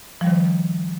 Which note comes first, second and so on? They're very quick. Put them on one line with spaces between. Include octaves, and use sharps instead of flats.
F3 G3 D#3